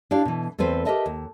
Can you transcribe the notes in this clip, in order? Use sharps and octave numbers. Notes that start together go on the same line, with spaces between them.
D4 E4 G4 D5 F5
B2 E3
E2 A3 C4 B4 C5
G4 A#4 B4 D#5 E5 A5
D#2